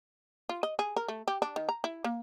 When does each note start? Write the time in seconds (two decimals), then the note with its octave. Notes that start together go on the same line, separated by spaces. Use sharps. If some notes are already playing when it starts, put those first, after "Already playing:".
0.49 F4
0.63 D#5
0.79 G#4
0.96 A#4
1.08 A3
1.28 G4
1.42 D4
1.56 D#3
1.69 A#5
1.84 E4
2.04 A#3